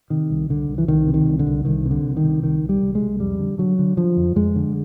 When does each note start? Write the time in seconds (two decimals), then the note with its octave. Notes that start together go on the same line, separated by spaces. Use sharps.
0.10 C3 D#3
0.30 C2
0.49 C2 D3
0.69 C2
0.78 E3
0.88 C2 D#3
1.07 C3
1.14 D#3
1.26 C2
1.39 D3
1.47 C2
1.65 C2 D#3
1.85 C3
1.91 D3
2.04 C2
2.17 D#3
2.23 C3
2.42 C2 D#3
2.62 C2
2.69 G3
2.82 C2
2.95 G#3
3.02 C2
3.20 F2 G3
3.39 D3
3.58 D3 F#3
3.79 D3
3.97 D3 F3
4.17 F2
4.36 F2 G#3
4.56 D3